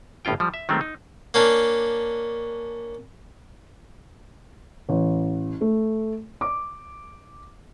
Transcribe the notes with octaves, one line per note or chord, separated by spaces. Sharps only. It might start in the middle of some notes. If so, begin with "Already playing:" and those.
G1 A2 C#4 F4 G5
F3 G3
E5
D#3 F#3 G#3 A3 B3 C4
D#4
A#3 C#4 D4
A1
A3
D6